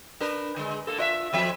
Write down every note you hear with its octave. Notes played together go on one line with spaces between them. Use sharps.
D4 A#4 B4
D3 G#3
A#3 A4
F4 D#5 E5
F2 F3 E5